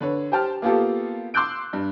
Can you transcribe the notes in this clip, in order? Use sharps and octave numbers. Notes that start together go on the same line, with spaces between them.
D3 B4 C#5
G4 C5 G5 A5 F6
A#3 B3 F4 G4 A4
C6 D6 E6 F#6 G6 D7
G2